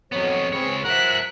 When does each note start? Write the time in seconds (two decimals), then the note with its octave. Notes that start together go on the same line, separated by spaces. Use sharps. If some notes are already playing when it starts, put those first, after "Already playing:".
0.12 F2 F#3 B3 C#5
0.53 C#2 C4 G#4 B4 C#5
0.85 F3 A#4 E5 F#5 F#6